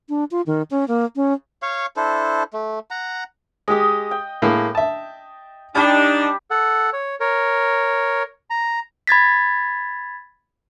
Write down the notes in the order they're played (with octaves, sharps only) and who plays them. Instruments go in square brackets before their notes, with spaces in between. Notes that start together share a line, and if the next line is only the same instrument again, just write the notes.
[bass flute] D4
F4
D#3
C#4
A#3
C#4
[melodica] C#5 F5 C#6
D4 E4 A4 C5
A3
F#5 A#5
[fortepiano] G#3 G4 [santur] D#5 D#6
[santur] G5
[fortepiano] A2 G#3 A#3
E5 A5
[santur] G3 G4 [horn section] D4 D#4 [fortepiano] A5
[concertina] A4 F#5
C#5
A#4 C#5
A#5
[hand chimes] B5 G#6 A6 B6